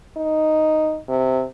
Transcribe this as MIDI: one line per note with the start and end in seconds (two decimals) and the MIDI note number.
0.17 0.98 63
1.08 1.43 48